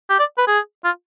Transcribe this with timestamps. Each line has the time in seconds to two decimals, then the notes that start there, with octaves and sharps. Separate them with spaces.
0.10 G4
0.19 D5
0.38 B4
0.48 G#4
0.84 F4